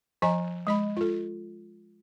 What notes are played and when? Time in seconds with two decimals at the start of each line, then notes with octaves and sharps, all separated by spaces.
0.22 F3 D#5 G#5 A#5
0.67 G#3 D#5 B5
0.97 F4 A4